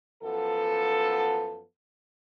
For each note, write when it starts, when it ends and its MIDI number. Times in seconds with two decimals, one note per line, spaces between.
0.23 1.62 42
0.23 1.62 53
0.23 1.62 59
0.23 1.62 69